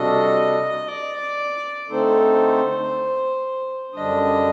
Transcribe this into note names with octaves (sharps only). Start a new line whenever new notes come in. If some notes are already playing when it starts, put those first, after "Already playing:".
Already playing: C3 G3 D4 F#4 A4 D#5
D5
D3 A3 C4 D#4 A4 C5
F#2 D3 G3 D4 D#5